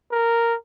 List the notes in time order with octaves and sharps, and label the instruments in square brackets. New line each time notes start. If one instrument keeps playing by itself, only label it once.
[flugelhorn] A#4